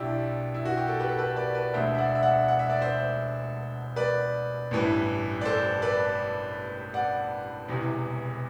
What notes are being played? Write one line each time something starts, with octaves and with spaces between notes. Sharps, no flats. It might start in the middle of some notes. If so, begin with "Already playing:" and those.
Already playing: B1 B2 D4 E4 G4
E4
F#4
G4
A4
G4 B4
A4
G4 B4
B4 D5
B4 D5
E1 D2 D3 C5 E5
E5
D5 F#5
E5
D5 F#5
F#5
E5
D5
C5 E5
B4 D5
A1 G2 E3
D5
A4 C5
B4 D5
D5 F#5
E1 E2 C3 E3